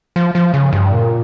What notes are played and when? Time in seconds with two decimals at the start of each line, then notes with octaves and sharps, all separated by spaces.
0.16 F3
0.35 F3
0.54 C#3
0.73 G2
0.92 A#2